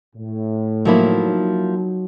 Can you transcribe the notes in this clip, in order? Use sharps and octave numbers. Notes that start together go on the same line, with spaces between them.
A2
F3 F#3 A#3 D#4 E4